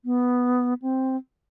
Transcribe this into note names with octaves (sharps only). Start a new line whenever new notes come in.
B3
C4